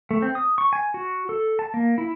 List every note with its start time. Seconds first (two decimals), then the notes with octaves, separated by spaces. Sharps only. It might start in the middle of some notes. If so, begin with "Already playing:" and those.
0.11 A3
0.22 C4
0.35 D#6
0.58 C#6
0.73 G#5
0.94 F#4
1.29 A4
1.59 A5
1.74 A#3
1.98 E4